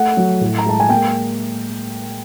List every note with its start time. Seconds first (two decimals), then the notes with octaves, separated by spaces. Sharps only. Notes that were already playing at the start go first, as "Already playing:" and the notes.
Already playing: A3 F#5
0.17 F#3
0.41 A2
0.59 A#5
0.66 G#3 A5
0.80 G#5
0.89 A#3 G5